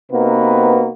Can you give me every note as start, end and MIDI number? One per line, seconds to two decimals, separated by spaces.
0.12 0.89 48
0.12 0.89 58
0.12 0.89 59
0.12 0.89 63
0.12 0.89 66
0.12 0.89 71